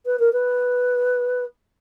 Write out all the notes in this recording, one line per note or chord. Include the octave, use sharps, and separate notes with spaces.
B4
A#4
B4